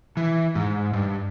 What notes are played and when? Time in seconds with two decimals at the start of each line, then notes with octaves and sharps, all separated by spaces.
0.17 E3
0.55 G#2
0.93 G2